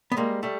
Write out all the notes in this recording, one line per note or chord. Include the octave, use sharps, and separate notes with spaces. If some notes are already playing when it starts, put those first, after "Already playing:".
B3
G3 G#3 A#3
G3 A3